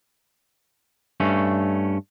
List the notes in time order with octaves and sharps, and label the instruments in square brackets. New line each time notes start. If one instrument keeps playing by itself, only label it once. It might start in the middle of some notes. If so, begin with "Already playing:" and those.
[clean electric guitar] G2 A3 C#4